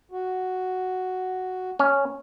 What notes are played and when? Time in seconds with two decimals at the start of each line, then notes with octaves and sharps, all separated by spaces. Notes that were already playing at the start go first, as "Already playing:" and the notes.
0.12 F#4
1.79 C#4